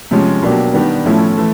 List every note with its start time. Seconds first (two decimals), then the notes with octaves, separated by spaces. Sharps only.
0.11 C3 F3 G#3 C#4
0.43 B2 F#3 A#3 D4 G4
0.73 D#3 G3 B3 D4
1.05 A2 F3 A3 C#4 E4
1.37 E3 A3